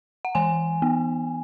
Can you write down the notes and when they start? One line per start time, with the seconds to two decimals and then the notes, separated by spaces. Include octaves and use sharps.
0.25 F#5
0.35 E3 G#5
0.82 B3